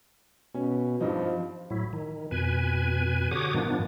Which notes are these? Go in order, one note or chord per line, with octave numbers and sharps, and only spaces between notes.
B2 C#4
G#1 G2 F3 D#4
A2 F#3 E4
D#3
F2 B2 B4 G#5
D3 F#4 G4 C#5 D6 D#6
G2 A#2 D#3 F3 B3 D4